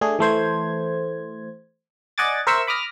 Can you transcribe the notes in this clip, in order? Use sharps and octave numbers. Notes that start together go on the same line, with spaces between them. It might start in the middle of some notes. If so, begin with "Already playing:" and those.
A3 D4 G#4
E3 A3 C5 G#6
D5 D#5 F#5 G#5 D6 A6
A#4 C5 E5 C#6 E6
B5 D6 D#6 F6 A#6